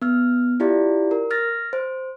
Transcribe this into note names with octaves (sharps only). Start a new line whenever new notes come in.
B3 F6
E4 F4 G4 D5
A#4
F6 A6 A#6
C5